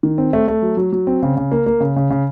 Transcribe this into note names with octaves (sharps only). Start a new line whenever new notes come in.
D#3
C4
A3
A3
F#3
F#3
F#3
C4
C#3
C#3
A#3
A#3
C#3
C#3
C#3